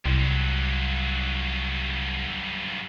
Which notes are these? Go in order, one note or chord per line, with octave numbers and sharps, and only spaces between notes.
C2 G2 F#3